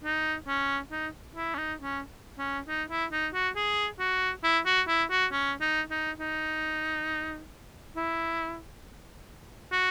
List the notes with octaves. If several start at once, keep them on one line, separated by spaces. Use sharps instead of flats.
D#4
C#4
D#4
E4
C#4
D#4
C#4
C#4
D#4
E4
D#4
F#4
G#4
F#4
E4
F#4
E4
F#4
C#4
D#4
D#4
D#4
E4
F#4